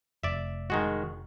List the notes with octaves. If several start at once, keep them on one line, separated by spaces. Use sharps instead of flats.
F1 D5 E5
D#3 G#3 F#4